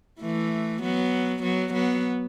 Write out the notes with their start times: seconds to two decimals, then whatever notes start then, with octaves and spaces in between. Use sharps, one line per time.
0.21 E3 A3
0.82 F#3 B3
1.43 F#3 B3
1.73 F#3 B3